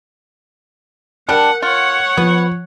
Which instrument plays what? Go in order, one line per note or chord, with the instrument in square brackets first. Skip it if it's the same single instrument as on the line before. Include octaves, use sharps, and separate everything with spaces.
[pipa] G3 D4 [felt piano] A#4 [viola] F#5
[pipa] F4 [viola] C#5 F#5
[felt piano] F3 [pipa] B3